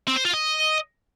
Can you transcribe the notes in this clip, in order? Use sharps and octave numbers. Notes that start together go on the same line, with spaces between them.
C4
C5
F4
D#5